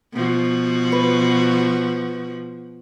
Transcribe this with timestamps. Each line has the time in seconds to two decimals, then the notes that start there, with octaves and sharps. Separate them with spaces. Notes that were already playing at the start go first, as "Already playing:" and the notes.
0.13 B2 F3 F#4
0.92 B4